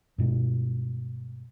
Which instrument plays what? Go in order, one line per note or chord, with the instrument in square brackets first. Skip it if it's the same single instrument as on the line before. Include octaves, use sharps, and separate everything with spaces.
[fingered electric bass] G2 B2 G#3